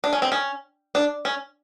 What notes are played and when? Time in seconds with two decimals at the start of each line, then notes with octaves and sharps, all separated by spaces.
0.04 D4
0.13 C#4
0.22 C4
0.32 C#4
0.95 D4
1.25 C#4